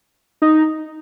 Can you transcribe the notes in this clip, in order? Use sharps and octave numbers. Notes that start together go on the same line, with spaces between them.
D#4